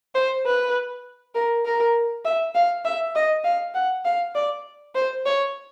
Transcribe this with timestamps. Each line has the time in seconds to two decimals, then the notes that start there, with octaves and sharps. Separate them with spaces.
0.15 C5
0.46 B4
1.35 A#4
1.65 A#4
2.25 E5
2.55 F5
2.85 E5
3.16 D#5
3.44 F5
3.74 F#5
4.05 F5
4.35 D5
4.95 C5
5.26 C#5